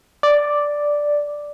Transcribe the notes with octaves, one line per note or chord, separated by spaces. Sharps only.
D5